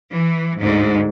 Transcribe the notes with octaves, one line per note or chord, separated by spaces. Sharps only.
E3
D2 G#2